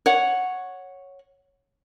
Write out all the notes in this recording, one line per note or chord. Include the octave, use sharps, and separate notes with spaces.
C#5 F#5